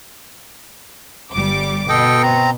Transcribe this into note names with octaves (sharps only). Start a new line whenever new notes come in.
G1 G3 D6
B2 A4 D#5 G5
C4 A#5